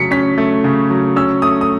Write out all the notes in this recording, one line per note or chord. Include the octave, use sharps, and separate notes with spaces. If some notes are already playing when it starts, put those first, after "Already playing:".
Already playing: C#3 F#3 A3 B6 C#7
C#4 B6
A3
C#3
F#3
C#4 E6
A3 D#6
D#6